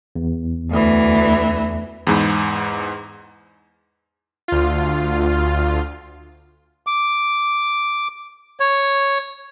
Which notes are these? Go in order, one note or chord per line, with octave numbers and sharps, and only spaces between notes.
E2
D2 E3
E2 G#2 B5
D2 F4
D6
C#5